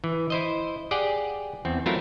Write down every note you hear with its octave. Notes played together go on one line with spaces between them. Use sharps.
E3
E4 C5 D#5
G4 G#4 D5 F#5 G5
E2 C4
F#3 A3 C4 E4 F4 A#4